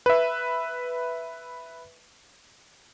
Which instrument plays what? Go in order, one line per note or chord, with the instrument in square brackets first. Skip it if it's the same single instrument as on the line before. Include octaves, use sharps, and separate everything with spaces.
[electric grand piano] B4 E5